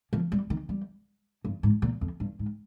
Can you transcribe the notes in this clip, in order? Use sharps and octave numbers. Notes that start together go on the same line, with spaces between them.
F3
G3
D#3
G3
G2
G#2
A#2
F2
G2
G#2